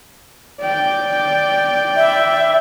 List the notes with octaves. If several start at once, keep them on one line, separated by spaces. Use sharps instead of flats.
D5 G5
E5